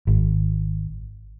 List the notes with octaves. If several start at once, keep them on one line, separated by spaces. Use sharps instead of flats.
G#1